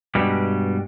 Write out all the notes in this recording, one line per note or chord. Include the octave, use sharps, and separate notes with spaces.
G2 B2 G3 G#3